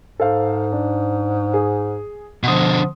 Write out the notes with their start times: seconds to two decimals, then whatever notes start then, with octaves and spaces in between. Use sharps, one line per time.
0.20 G#2 A4 C5 F5
0.72 D4
1.54 G#4
2.43 B2 D3 F3 F#5 C6 D#6